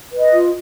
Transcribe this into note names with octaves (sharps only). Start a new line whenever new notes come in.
B4
D#5
F4